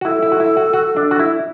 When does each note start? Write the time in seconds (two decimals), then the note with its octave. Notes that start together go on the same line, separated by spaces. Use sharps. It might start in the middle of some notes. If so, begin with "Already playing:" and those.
0.01 F#4
0.05 E4 A4
0.23 E4
0.32 F#4
0.40 E4
0.57 F#4
0.73 F#4
0.97 D4
1.11 F#4
1.19 E4